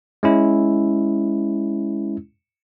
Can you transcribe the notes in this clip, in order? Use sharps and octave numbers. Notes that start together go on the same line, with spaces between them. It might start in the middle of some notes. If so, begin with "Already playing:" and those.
G#3 C#4 E4